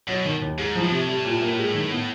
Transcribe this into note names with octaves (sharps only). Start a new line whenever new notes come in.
B2 F#3
D#3
D#2
G#2 G#3
F3
A2
C3
G3
A#2
A#3
G#3
D#3
B3